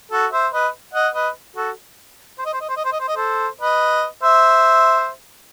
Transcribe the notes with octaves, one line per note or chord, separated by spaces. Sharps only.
F#4 A4
C5 E5
B4 D#5
D#5 F#5
B4 D#5
F#4 A4
C5
D#5
C5
D#5
C5
D#5
C5
D#5
C5
D#5
A4 C5
B4 D#5
C5 E5